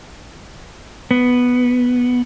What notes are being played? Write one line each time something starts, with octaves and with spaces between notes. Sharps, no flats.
B3